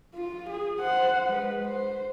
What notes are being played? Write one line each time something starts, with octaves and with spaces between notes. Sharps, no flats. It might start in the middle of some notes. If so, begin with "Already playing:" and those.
F4
G#4
C5 F#5
G#3 B4
C5